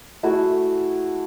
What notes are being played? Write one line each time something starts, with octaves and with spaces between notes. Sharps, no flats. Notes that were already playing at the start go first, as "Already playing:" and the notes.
A3 E4 F#4 G#4